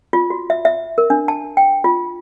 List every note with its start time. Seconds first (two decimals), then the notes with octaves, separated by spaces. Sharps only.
0.13 F4
0.30 F#4
0.50 E5
0.65 E5
0.98 A#4
1.10 D4
1.28 A5
1.57 G5
1.84 F4